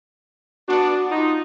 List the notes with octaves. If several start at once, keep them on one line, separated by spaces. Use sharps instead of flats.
B3 D4 F#4
D#4 F4